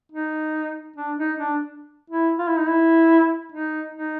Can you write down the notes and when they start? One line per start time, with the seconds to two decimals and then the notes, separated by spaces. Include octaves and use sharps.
0.12 D#4
0.96 D4
1.18 D#4
1.39 D4
2.10 E4
2.38 F4
2.48 E4
2.59 D#4
2.68 E4
3.52 D#4
3.94 D#4